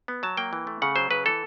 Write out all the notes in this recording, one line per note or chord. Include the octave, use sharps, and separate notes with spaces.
B3
F#3 A5
A#3 G5
E3
A3
C#3 F#5
F#3 C5
C#3 B4
E3 A4